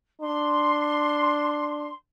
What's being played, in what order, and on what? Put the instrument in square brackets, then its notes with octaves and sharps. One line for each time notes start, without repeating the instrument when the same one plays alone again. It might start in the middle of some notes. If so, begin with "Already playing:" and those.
[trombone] D4 [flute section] C6